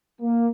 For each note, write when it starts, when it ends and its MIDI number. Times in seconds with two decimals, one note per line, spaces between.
0.22 0.48 58